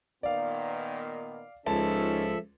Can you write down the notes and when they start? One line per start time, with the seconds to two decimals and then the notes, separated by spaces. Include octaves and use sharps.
0.23 A#2 D#3 B3 D5 F5
1.67 C#2 F3 C#4 D#4 A4 E5 A5